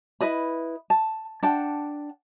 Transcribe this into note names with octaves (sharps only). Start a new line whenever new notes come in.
E4 B4 D#5 B5
A5
D4 F#5 G5 A5